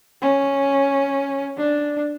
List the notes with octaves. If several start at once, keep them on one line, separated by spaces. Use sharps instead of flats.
C#4
D4